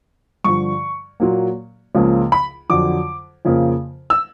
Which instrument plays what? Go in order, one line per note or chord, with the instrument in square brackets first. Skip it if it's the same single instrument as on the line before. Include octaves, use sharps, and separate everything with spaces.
[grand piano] G2 D3 F3 C#6
A#2 F#3 A#3
C#2 C#3 F3 A#3
B5
F2 D3 F#3 D6
F2 C#3 F3 A#3
E6